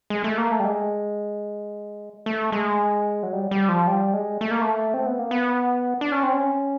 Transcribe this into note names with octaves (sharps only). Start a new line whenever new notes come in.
G#3
A3
A#3
A3
G3
G#3
A3
G#3
F#3
G3
G3
F3
G3
G#3
A3
A#3
A3
C4
B3
A#3
B3
D4
C#4
C4
C#4